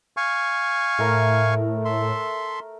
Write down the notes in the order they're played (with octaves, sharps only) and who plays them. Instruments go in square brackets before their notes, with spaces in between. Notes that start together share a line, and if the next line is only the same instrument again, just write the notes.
[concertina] F5 G#5 C#6
[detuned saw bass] A2 [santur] A3 A#4
[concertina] A4 E5 C6